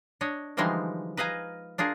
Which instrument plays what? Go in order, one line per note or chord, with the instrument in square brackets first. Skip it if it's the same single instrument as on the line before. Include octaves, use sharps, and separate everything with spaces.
[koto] D4 C#5 D#5
D3 E3 F3 G3 G#3 D#4
B4 D#5 F5 G#5 A#5
D4 F4 G#4 A#4